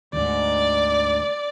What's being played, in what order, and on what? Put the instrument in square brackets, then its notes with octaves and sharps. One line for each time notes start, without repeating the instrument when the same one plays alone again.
[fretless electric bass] D2 G#2 [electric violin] D5